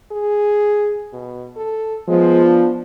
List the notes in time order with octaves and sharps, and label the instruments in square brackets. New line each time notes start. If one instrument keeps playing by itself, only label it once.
[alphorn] G#4
B2
A4
[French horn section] F3 B3 [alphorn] G#3
[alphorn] D4